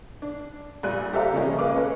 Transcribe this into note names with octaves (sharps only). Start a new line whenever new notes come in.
D4
A#1 G3 F#6 D#7
G4 A4 C5 E5 F5 A#5
C#3 F3 G3 G#3 A#3 C#4
B4 D#5 F5 D6
G#3 C#4 A4 B4